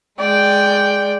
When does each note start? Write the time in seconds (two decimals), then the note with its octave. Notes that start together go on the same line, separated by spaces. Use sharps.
0.19 G#3 D5 G5